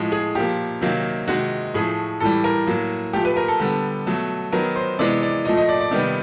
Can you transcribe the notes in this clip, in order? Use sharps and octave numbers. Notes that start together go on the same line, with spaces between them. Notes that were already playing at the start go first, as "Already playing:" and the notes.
Already playing: A2 F3 G#3
G#4
A#2 F3 A#3 G4
C3 D#3 F#3 A#3
C3 D#3 G#3 F#4
A2 F3 A3 G#4
A2 E3 G3 A4
A#4
A2 F#3 A#3
A#2 F3 A3 G4
B4
A#4
A4
D3 G3 B3
B2 F#3 A3
D#3 F#3 B3 A#4
C5
C3 E3 G#3 B3 D5
D5
A#2 F3 A3 D#5
D#5
D5
D5
C3 D#3 G3 B3